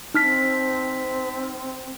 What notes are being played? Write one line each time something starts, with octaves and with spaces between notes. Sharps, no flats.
C4 D#4 F6 B6